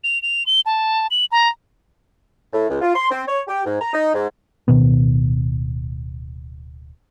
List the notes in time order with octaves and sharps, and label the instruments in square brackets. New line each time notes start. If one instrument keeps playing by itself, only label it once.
[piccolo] F7
F7
G7
A5
F#7
A#5
[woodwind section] A2
C#2
F4
C6
C4
C#5
G4
G#2
A#5
D#4
G#2
[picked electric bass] D1 B2 D#3 B3